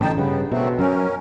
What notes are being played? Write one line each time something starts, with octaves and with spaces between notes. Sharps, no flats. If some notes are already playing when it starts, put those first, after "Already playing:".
A1 D3 D#4 G5 A5
G2 C#3 B3
B2 F#3 A3 C4
F#2 C#4 A#4